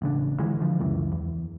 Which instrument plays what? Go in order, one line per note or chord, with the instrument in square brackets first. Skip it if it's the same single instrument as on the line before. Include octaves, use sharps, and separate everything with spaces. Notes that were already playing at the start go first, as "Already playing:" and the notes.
[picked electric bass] A1 C#3 D4
D3 E3 F3 G#3
D3 F3
C#2 F#2 E3
E2